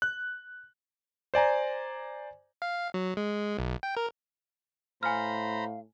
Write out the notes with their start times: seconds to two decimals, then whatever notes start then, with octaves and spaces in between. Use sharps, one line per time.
0.02 F#6
1.34 C5 D5 G#5 A#5
2.62 F5
2.94 F#3
3.17 G#3
3.59 B1
3.83 G5
3.97 A#4
5.03 A2 C5 F5 G#5 A#5 B5 F6